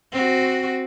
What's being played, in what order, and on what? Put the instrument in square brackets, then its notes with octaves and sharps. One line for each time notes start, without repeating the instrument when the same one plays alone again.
[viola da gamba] C4 F#4